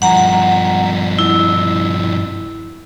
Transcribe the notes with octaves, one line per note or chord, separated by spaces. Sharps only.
G2 F3 F#5 A#5
E4